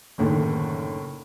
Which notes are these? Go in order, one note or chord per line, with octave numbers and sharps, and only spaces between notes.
F#1 A2 D3 D#3